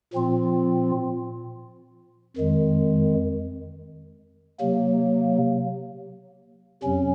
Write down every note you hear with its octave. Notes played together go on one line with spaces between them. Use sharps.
A#2 F3 C4 F4
F2 D#3 G#3
C3 F#3 A#3
F2 C3 F#3 C#4